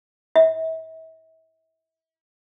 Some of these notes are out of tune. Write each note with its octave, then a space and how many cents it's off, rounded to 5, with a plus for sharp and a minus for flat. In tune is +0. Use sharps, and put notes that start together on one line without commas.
E5 -40